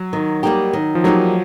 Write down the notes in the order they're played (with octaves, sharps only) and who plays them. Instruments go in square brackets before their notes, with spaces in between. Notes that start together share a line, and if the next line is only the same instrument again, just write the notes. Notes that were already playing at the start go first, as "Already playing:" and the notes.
Already playing: [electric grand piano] F#3
[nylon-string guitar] D#3
G3 A#3 D#4 G4
D#3
[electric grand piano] F3
[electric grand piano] F#3 [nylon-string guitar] G3 A#3 D#4 G4